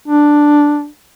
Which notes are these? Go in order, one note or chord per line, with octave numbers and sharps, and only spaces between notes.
D4